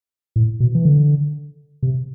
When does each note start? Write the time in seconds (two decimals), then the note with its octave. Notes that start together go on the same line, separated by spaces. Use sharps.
0.36 A2
0.60 B2
0.75 E3
0.85 D3
1.83 C3